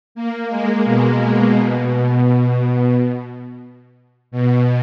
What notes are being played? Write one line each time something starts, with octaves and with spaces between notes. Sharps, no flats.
A#3
G#3
B2
B2
B2